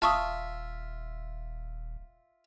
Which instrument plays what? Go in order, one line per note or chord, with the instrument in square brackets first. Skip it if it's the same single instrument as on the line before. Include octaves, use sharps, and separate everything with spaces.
[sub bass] D#1 [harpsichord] F4 E5 [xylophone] A5 C#6 D#6